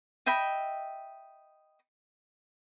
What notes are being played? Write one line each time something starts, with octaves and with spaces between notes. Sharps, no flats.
D#5 E5 G5 B5